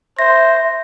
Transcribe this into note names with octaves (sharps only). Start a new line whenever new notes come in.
C5 E5 A#6